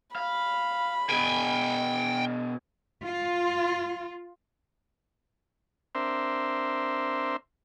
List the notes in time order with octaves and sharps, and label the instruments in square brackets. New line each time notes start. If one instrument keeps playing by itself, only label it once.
[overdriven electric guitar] F5 [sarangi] B5
[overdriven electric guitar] B2 G#4 [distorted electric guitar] G5 G#5
[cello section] F4
[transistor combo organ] C4 D4 A#4 C5 E5